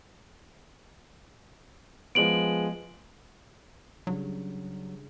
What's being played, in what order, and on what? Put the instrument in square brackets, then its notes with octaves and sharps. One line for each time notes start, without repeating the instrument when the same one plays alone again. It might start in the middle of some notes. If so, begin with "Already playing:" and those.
[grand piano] F3 G#3 B3 [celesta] D7 F#7
[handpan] C#3 G3 D4 [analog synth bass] F#3